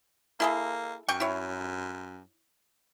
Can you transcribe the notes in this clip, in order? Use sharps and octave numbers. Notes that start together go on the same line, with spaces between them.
A#3 E4 G#4 A4
F#2 G5 C#6
E4 C#5